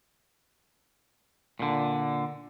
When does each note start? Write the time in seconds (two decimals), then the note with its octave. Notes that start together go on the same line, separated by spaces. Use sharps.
1.59 A#2 D3